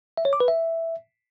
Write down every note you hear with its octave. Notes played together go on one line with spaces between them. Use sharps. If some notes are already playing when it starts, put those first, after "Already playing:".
E5
C#5
D6
B4
E5